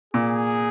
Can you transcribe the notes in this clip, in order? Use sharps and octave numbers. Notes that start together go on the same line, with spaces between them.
A#2 G#4